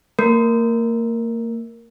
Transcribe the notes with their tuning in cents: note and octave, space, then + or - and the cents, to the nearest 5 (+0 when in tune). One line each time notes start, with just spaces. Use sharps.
A#3 -35 A#4 +0